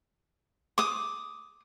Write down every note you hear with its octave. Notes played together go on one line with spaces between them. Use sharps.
D6 D#6